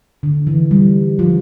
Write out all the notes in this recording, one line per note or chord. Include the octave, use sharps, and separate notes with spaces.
D3
E3
G3
F3